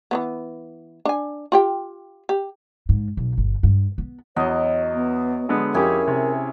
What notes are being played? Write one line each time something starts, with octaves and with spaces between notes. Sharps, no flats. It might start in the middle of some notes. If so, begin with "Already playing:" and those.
E3 F3 B3
D4 G#5
F4 G4 G5
G4
G#2
B1
G1
G2
B3
E2 F#3 C#5 D#5
B3
D3 G#3 B3
F2 C#4 E4 G4 G#4 A#4
C3